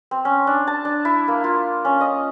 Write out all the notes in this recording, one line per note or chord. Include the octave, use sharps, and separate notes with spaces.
C4
C#4
D4
A5
D4
E4
A#3
F4
C#4
D#5